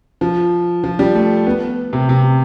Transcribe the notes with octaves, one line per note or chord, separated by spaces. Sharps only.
F3
F3
G3
A3
B3
C3
C3